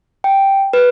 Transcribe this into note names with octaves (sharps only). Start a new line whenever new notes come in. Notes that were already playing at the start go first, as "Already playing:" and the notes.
G5
B4